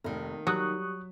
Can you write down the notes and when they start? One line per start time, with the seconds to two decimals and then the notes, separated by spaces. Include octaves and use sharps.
0.04 F1 D#3 A#3
0.47 F#3 G3 C#6 D#6 F#6